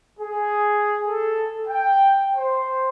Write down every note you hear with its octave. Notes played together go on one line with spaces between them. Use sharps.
G#4
A4
G5
C5